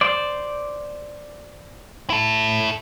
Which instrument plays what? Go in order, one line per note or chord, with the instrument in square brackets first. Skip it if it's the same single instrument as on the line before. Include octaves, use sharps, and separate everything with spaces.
[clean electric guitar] C5 D5
[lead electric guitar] E4 A4